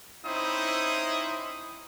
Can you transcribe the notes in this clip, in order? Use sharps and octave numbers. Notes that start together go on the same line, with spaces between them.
C4 C#4 D#4 E4 C5 D#6